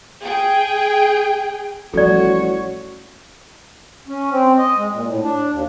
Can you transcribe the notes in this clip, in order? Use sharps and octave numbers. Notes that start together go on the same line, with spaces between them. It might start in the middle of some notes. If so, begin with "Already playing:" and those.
G#4 G5
A1 F3 G3 F#4 A4 C#5 D5
C#4
C4
D#5
G#3
A#2
A2
D4
D#2